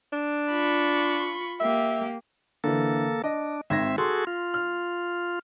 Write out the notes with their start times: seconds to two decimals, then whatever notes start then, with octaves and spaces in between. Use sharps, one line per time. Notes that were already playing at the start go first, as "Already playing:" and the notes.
0.13 D4
0.51 F4 B5 C#6
1.60 A#3 G4 E5
2.64 D3 E3 A#3 A4
3.24 D4 D#5
3.70 G#1 C4 E5 G#6 A#6
3.98 F#4 G#4 A4 C6
4.27 F4
4.54 F6